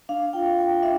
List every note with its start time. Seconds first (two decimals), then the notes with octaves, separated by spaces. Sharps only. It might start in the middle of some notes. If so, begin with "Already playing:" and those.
0.09 D4 F5
0.33 F4 G5
0.58 F4 G5
0.83 D4 E5